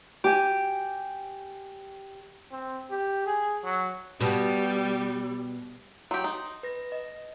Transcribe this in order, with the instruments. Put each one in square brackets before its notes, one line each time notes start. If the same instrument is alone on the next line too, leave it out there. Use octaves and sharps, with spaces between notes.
[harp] G4 G#5
[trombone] C4
G4
G#4
F#3
[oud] B2 [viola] G3
[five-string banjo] F#3 G4 [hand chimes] C6
[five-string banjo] D#4
[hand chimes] B4 A#6
D#5